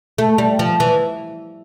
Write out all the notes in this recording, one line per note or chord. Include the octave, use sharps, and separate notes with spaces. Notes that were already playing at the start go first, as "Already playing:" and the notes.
A3
G3
F3
E3